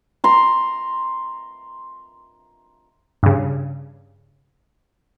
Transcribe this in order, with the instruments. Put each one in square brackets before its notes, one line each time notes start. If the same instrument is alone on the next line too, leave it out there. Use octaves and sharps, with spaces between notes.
[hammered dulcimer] A#5 C6
[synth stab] G2 C#3